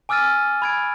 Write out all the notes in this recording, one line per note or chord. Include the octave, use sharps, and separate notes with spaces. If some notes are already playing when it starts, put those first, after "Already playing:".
G#5 D6 E6 F6 A6 D#7
B5 G#6 D7